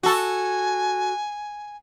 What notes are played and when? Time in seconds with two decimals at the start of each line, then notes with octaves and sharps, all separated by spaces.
0.03 F#4 A4 G#5